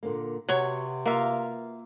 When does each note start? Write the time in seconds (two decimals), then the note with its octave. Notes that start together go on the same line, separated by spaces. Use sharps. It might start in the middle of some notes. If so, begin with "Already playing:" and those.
0.03 A#2 D3 A#3
0.49 C3 F#3 B3 C#5
1.06 A#3 F4 F#4 E5